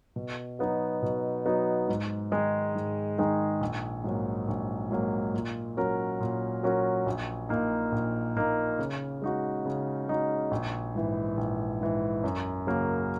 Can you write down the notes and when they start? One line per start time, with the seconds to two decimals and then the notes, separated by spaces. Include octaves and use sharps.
0.16 B2
0.59 F#3 B3 D#4 F#4
1.02 B2
1.46 F#3 B3 D#4 F#4
1.88 G#2
2.31 D#3 G#3 D#4 G#4
2.75 G#2
3.18 D#3 G#3 D#4 G#4
3.61 A#1
4.04 G#2 F#3 A#3
4.48 A#1
4.90 G#2 F#3 A#3
5.34 A#2
5.77 F#3 C#4 F#4 A#4
6.20 A#2
6.63 F#3 C#4 F#4 A#4
7.06 A#1
7.49 A#2 A#3 D#4
7.92 A#1
8.36 A#2 A#3 D#4
8.79 C#3
9.21 G#3 D#4 F#4
9.65 C#3
10.08 G#3 D#4 F#4
10.51 A#1
10.95 G#2 E3
11.37 A#1
11.81 G#2 E3
12.24 F#2
12.67 C#3 F#3 A#3